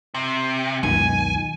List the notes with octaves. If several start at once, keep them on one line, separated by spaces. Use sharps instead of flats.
C3
C#2 F#2 B2 D#3 G#5